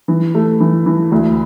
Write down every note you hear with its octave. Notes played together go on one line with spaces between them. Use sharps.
E3
A3
E3
E3
D2